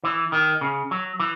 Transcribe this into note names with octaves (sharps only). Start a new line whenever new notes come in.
E3
D#3
C#3
F#3
E3